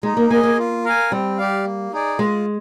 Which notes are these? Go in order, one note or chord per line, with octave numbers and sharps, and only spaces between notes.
G#3 D#4
A#3
A#3 G#4 D#5 G#5
A#3
F4
A#4 F5 G#5
G3 C4
G4 D5 F5
A#3
D#4 G#4 D5
G#3 F4